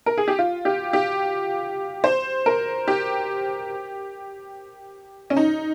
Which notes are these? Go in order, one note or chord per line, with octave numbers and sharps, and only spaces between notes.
A#4
G#4
G4
F4
G4
G4
C5
A#4
G4
C#4
D#4